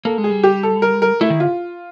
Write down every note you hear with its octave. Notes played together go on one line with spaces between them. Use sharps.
A#3 A4
G#3
G#4
G3
G4
A4
A#4
A#4
A3 E4
D#3
D3 F4